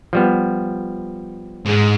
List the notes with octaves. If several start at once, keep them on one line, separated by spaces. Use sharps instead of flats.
F3 G3 B3
G#2 G#3